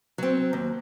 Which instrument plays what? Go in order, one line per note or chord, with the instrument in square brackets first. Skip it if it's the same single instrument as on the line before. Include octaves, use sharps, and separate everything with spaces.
[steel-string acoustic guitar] F#3 C4
D#2